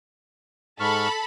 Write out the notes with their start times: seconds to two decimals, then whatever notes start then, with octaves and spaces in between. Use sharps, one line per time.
0.80 G#2 A4 A5 B5 C#6 F6